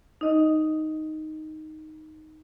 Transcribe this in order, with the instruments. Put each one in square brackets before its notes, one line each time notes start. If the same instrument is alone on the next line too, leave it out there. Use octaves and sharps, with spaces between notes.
[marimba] D#4 D#5